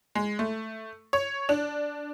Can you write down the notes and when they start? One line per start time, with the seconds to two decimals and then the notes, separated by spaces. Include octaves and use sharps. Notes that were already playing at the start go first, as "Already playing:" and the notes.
0.15 G#3
0.39 A3
1.13 C#5
1.49 D4